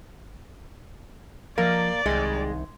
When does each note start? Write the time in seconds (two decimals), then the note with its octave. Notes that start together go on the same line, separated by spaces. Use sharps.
1.58 F3 A#3 A#4 D5 D#5
2.06 C2 D#3 G#3 D#4